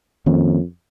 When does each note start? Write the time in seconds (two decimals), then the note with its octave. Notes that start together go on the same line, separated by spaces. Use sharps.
0.26 F2 D#3 A#3 C#4